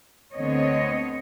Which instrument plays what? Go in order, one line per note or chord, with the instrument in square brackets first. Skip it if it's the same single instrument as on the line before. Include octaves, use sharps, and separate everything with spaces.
[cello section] D2 D3 B3 C4 C#5 D#5